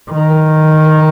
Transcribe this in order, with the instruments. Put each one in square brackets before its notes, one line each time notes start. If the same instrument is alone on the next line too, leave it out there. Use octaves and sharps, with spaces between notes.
[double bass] D#3